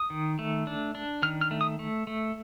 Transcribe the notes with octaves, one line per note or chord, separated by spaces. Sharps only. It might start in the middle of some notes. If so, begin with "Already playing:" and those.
Already playing: D#6
D#3
A3
D4
D4
D#3 F6
F6
A3
D#6
A3
A3